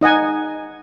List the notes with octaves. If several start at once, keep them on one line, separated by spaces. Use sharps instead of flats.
D#4 D#5 F#5 G#5